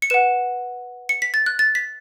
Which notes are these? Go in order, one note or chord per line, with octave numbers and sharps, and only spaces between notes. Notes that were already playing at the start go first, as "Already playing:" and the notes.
C#7
B4 F#5 E7
C#7
B6
A6
F#6
A6
B6